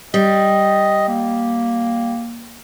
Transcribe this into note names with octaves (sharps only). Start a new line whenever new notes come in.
G3 D#5
A#3